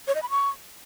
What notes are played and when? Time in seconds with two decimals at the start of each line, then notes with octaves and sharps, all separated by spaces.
0.07 C#5
0.15 D#5
0.22 B5
0.30 C#6